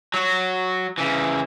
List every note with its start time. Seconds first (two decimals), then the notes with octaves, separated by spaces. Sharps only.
0.14 F#3 F#4
0.98 C#3 E3